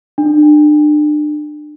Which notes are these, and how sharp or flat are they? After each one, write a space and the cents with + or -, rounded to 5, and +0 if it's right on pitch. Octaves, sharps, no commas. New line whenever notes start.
D4 +35